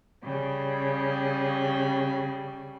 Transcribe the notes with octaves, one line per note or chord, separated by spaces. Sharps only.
C#3 G3